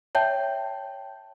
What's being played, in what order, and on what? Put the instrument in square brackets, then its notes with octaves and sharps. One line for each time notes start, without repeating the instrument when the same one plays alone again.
[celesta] C#5 E5 G5 A5 G6